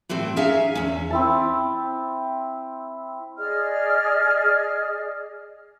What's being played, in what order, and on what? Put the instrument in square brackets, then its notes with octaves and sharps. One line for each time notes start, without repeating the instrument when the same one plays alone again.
[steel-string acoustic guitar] A2 E3 G3 C4
C#4 D#4 G#4 E5 F5
E2 C#4
[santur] C4 E4 A5
[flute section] G#4 D5 D#5 F6